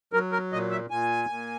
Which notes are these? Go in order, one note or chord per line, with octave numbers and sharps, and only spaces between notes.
F#3 A#4
A#4
A#2 D#5
E5
A#2 G#5
A#2